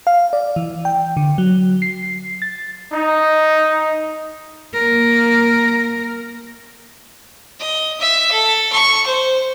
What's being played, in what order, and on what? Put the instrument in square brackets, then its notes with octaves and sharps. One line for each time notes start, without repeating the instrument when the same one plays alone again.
[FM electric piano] F5
D5
E3
G5
D3
F#3
C7
A6
[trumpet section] D#4
[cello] A#3 A#4
[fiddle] D#5
E5
A4
C#6
C5